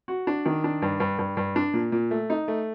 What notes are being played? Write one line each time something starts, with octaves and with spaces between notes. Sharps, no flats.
F#4
D4
D#3
D4
G2
G2
G2
G2
D4
A#2
A#2
A3
D#4
A3